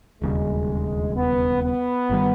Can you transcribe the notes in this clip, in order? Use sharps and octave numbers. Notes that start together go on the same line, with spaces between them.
E1 D#2 C#3 G3 G#3
B3
B3
G1 D#3 G3